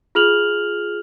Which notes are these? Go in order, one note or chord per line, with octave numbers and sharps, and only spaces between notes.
F4 G#4 F6 F7 F#7